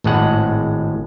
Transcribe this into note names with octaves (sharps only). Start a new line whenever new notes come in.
G#1 A2 G#3 F#5